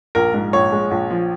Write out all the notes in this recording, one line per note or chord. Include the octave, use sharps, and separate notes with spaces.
A#1 A#4
G#2
A#1 C#5
G#3
A#1
F3